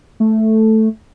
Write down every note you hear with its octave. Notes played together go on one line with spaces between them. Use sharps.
A3